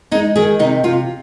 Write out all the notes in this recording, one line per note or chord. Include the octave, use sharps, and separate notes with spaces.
G#3 D#4
D#3 G#4
C3 D#4
C3 F4